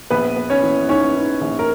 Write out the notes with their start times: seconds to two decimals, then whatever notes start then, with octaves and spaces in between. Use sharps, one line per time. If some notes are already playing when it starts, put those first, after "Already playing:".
0.10 A#1 B3 B4
0.36 B3
0.50 C#4 C#5
0.63 E3
0.89 G#2 C#4 C#5
1.15 G#2
1.41 A#1
1.59 A#4